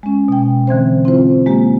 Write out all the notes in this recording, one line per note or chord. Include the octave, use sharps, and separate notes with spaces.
G#3 C#4
B2 G5
D3 E3 C4 C5
C4 E4 F4 C5
G#3 A#3 G4